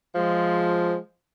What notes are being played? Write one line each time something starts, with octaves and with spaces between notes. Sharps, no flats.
F3 G#3